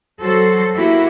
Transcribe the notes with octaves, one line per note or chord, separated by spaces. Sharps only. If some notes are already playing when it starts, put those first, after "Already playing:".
F#3 F#4 A4 C5
A#3 E4 F#4 G4